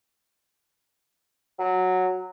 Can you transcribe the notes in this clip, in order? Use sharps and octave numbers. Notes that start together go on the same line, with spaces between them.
F#3